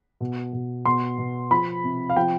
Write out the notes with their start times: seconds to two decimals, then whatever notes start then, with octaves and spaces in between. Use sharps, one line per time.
0.21 B2
0.53 B2
0.85 B2 C6
1.18 B2
1.51 F3 B5
1.84 C3
2.10 F5
2.16 F3 G5